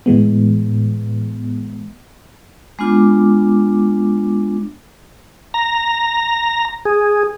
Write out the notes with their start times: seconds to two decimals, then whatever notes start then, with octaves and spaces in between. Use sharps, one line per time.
0.06 A2 E3 G#3 B3
2.79 G#3 B3 D4 F4 D6
5.54 A#5
6.85 G#4